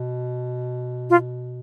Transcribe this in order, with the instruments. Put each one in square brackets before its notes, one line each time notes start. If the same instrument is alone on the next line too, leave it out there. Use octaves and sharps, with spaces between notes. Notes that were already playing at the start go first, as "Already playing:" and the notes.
Already playing: [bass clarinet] B2
[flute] F4